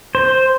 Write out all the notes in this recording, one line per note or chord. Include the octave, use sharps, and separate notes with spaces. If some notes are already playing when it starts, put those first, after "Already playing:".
C5